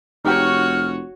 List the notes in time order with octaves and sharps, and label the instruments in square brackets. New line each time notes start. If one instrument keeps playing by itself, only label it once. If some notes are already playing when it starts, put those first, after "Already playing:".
[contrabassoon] F1 [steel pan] D#4 G4 G5 [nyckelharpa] F#4 C#5 [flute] F6